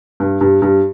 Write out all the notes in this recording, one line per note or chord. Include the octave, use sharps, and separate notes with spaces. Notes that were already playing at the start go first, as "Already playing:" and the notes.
G2
G2
G2